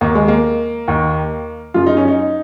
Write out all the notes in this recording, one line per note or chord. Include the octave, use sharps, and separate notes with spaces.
D#2 D#3 A#3
G#3
A#3
D#2 D#3
F#2 C#3 F4
D#4
C#4
D#4